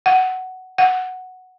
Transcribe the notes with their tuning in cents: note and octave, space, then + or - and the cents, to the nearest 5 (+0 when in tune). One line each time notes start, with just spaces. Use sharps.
F#5 +10
F#5 +0